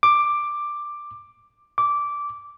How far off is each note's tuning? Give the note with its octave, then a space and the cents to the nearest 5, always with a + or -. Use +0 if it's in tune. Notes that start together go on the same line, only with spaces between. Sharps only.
D6 +10
D6 -10